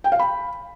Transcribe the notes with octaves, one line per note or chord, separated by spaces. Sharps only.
G5
F5
B5